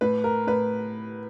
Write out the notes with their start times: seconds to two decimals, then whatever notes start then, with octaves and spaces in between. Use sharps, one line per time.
0.01 A2 B4
0.24 A#4
0.47 A2 B4